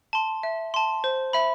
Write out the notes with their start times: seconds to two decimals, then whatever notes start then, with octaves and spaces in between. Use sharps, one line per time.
0.13 A5 C6
0.43 E5
0.74 A5 C6
1.04 C5
1.33 E5 B5